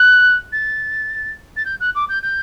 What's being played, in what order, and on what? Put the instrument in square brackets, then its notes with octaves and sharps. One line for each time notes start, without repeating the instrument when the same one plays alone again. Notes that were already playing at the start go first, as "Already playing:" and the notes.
Already playing: [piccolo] F#6
A6
A6
G6
F#6
D6
G6
G6